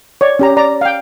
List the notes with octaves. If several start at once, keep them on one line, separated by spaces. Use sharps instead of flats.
C#5 D5
C#4 G4 A#5
D5 A#5
F5 G5